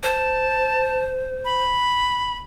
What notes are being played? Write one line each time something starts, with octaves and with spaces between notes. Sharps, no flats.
C5 A5
B5